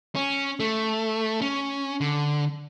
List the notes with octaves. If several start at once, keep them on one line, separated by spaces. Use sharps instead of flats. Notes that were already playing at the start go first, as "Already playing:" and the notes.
C#4
A3
C#4
D3